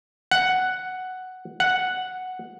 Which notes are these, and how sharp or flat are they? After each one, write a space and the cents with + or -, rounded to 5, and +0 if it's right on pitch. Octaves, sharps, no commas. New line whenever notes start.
F#5 +5
F#5 +0